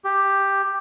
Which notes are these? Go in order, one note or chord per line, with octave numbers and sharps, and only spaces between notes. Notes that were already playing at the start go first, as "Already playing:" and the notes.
G4